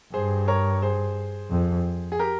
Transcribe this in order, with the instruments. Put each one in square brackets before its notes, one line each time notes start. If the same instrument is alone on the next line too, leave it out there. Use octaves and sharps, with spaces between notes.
[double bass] G2 [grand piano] G#4 C5
[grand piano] A#4 C#5
G#4 C5
[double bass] F2
[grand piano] G#4
G4 A#4